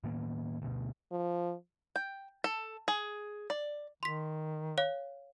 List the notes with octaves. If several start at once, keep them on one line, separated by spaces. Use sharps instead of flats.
A2 D#3 A#3 B3
D2 B2
F3
G5
A4
G#4
D5
D#3 C6 B6
C#5 F5